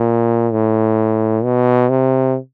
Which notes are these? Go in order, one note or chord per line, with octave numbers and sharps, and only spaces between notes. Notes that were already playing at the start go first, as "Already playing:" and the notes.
Already playing: A#2
A2
B2
C3